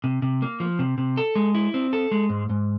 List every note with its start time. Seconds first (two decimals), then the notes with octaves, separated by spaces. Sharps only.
0.04 C3
0.22 C3
0.42 A#3
0.60 F3
0.79 C3
0.98 C3
1.17 A4
1.36 G#3
1.55 E4
1.74 C4
1.93 A4
2.11 G#3
2.30 G#2
2.50 G#2